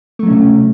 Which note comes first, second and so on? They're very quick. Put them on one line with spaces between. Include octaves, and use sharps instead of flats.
A3 F#3 C#4 C3